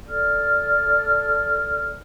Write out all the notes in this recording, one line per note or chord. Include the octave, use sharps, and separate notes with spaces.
A4 D5 F6